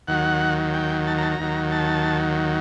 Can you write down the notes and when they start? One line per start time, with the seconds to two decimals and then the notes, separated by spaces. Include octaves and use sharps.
0.08 D#2 D#3 F#3 F#5
0.73 G5
1.07 A5
1.18 A#5
1.22 A5
1.31 A#5
1.39 D#2 D#3 F#3
1.72 A5